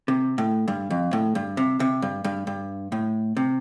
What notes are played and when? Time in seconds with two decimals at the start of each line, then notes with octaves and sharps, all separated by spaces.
0.08 C3
0.38 A2
0.68 G2
0.90 F2
1.13 A2
1.35 G2
1.57 C3
1.80 C3
2.02 G2
2.24 G2
2.47 G2
2.92 A2
3.37 C3